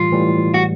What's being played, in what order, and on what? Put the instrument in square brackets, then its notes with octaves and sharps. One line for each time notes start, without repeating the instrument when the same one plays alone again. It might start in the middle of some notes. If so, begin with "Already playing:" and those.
Already playing: [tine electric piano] A2 E3 G3 [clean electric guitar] F4
[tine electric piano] A2 E3 G3
[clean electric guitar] F#4